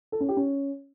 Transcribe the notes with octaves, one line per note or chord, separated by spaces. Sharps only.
A4
C#4
G4
C#4